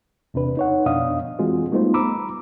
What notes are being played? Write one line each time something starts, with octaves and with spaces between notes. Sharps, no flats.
E2 C3 D4 B4
D#4 C#5 F#5
F2 B2 D4 D#5 F5 D#6
E3 G#3 C4 F4 F#4
G3 A3 B3 D#4 F4 C5
A#5 B5 D6 E6